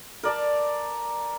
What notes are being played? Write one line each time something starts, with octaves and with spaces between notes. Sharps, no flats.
A#4 D5 A5